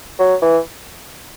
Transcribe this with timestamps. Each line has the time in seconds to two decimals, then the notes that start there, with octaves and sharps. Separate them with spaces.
0.19 F#3
0.42 E3